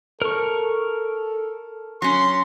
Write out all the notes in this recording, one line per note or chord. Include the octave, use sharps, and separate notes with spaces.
A4 A#4 C#6
F#3 C#4 C6